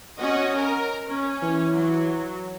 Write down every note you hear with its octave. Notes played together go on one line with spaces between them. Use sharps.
C#4 F#4 D#5
A#4
C#4
E3
F#3